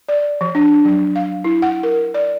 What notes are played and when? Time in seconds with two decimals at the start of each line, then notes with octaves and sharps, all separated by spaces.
0.08 D5
0.41 F3
0.55 D4
0.85 F#3
1.16 F5
1.44 E4
1.62 F#5
1.83 A#4
2.14 D5